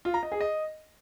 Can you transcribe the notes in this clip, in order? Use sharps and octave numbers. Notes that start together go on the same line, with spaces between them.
F4
A#5
D#5
G#4
D#5